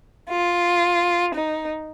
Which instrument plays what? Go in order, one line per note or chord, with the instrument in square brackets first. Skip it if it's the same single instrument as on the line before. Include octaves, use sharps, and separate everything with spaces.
[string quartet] F4
D#4